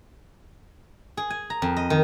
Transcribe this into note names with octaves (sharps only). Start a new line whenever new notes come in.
G#4
G#5
A#5
F2
D#5
D#3